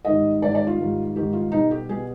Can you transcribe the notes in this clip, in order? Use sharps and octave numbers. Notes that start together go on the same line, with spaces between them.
G#2 D#3 G3 D#5
G#2 D#3 G3 D5
D5
F4
G#2 D#3 G3
G#2 D#3 G3 G4
F4
B2 G3 D#4
G4
B2 G3 G#4